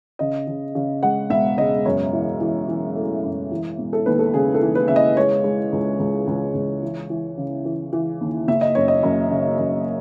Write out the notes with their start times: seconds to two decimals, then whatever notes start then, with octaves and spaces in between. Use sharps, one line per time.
0.19 C#3 D#5
0.47 C#3
0.75 C#3
1.03 G#3 F#5
1.30 E1 E5
1.58 C#3 D#5
1.85 F#2 C#5
2.13 E3
2.40 E3
2.68 E3
2.96 A3
3.24 F#2
3.51 E3
3.79 E1
3.93 A4
4.06 D#2 B4
4.19 A4
4.34 C#3 G#4
4.54 A4
4.62 E3
4.75 B4
4.88 C#3 E5
4.96 D#5
5.17 G#3 C#5
5.44 G#3
5.72 C#2
6.00 C#2
6.27 C#2
6.54 C#2
6.82 E3
7.10 E3
7.38 C#3
7.65 E3
7.93 E3
8.21 D#2
8.48 F#1 E5
8.61 D#5
8.75 F#2 C#5
8.88 D#5
9.03 F#2
9.31 C#3
9.58 F#2